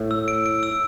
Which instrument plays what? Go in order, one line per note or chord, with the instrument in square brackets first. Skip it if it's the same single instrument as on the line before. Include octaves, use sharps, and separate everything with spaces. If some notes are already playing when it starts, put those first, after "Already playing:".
Already playing: [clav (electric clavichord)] A2
[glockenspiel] E6
D7
D7
E6